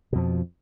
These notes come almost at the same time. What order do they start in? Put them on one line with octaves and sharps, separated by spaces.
B2 F2 F3